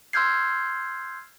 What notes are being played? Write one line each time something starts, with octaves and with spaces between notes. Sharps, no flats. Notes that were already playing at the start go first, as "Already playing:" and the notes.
C6 E6 F6 G6 G#6 C7